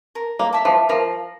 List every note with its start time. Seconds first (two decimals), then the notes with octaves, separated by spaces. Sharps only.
0.15 A#4
0.39 A#3
0.53 E5 A5 D6
0.65 F3
0.89 F3 A#4